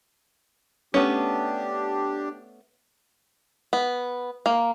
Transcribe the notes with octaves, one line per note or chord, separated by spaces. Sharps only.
A3 B3 C#4 D4 G4
B3
A#3